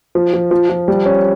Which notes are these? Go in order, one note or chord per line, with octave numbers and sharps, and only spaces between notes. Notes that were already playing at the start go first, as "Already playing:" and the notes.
F3
F3
F3
F3
G3
C#4